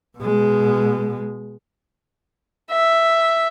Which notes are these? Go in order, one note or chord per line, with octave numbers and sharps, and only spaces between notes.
B2 G#3
E5